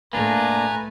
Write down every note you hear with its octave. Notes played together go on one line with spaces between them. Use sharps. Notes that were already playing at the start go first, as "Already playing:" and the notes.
A2 A3 A#3 D4 B4 G#5 A#5